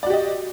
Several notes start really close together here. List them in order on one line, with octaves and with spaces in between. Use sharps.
D5 F#4 G4 D#5